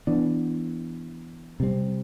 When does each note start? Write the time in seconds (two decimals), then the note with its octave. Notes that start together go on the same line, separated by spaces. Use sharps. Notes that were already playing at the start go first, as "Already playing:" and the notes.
0.07 E3 B3 D4
1.60 C3 G3 C4